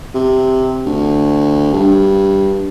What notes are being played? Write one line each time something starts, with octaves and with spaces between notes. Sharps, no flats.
C3
D2
G2